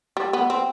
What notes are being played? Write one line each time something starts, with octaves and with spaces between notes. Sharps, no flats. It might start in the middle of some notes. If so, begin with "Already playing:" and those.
G3
B3
C4